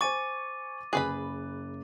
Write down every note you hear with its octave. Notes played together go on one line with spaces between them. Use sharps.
C5 G#5 C#6 D6 A6 D#7
F#1 G#4 B4 B5 F#6